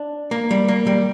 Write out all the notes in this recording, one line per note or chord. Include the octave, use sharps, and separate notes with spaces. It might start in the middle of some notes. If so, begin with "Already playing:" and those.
Already playing: D4
A#3
G3
A#3
G3